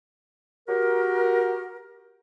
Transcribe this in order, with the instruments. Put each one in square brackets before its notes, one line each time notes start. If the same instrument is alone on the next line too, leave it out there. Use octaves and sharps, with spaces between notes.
[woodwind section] F#4 G4 A#4